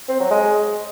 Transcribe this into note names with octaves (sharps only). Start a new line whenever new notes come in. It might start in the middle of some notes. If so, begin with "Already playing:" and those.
C4
F#3
G#3